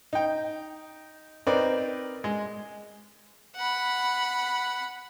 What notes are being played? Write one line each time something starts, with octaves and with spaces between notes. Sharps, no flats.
D#4 G5
C4 D#4 A#4 B4 D5
G#3
F#5 B5